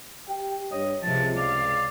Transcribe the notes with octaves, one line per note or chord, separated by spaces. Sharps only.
G4 G5
G2 C#5 D#5
C#2 C3 F3 A5
D5 F5